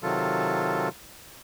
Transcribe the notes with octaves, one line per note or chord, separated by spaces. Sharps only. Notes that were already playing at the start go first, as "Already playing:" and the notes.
C3 D#3 F#3 F4 A4